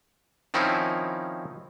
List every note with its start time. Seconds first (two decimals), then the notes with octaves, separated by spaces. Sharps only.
0.54 D#3 F3 C4 C#4 D#4 E4